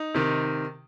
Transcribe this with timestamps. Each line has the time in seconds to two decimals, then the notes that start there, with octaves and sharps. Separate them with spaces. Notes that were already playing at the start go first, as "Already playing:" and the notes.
Already playing: D#4
0.14 C3 D#3